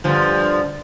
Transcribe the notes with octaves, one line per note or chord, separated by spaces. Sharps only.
G2 D3 F3